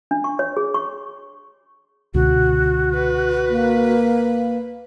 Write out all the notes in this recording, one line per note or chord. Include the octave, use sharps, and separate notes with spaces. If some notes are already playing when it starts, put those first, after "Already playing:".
D4
C#6
C#5
G#4
C#6
C#2 B2 D3 F#4
B4
A#3